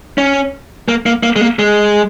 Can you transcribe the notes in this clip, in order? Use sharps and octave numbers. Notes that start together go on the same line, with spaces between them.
C#4
A#3
A#3
A#3
G#3
A#3
G#3